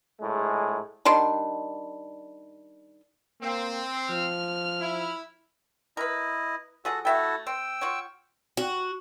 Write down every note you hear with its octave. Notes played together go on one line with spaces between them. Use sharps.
A#1 A2 G#3
D#3 G3 D4 C6
A#3 C4
F3 F6
E4
E4 A#4 B4 D#5
F3 F#4 G#4 A4 F#5
A3 E4 F#4 A4 E5 G5
C4 G5 E6
F4 F#4 C#5
F#4